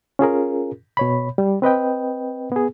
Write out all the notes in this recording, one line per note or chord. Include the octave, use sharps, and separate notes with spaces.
C#4 F4 G#4 A#4
B2 C#5 B5
G3
C4 B4 D#5 G5
B3 G#4